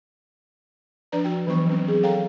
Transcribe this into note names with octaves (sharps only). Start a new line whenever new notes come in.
F3 D4 B4 D5 A#5
F#4 G5
E3 F#3 B3 C5 C#6
F#3 C4 C#4
G#4
A4 C#5 F5 G5 A#5